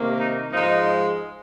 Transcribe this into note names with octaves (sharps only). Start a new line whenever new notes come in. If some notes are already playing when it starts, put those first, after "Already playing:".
Already playing: C3 D#3 A#3
D#4
G#2 F3 G#3 D#4